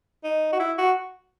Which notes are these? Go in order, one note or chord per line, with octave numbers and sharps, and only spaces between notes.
D#4
F#4
E4
F#4